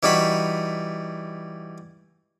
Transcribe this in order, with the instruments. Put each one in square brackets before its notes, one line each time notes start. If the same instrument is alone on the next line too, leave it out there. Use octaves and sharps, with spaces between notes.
[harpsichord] E3 G3 D#4 F#4 B5